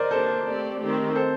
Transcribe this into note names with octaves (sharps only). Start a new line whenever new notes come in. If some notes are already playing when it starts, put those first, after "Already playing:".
Already playing: A#4 C5 D5 D#5
A#3 D4 G4 A4 C5
A3 C4 G4 D5
D#3 A3 C4 G4
A4 C5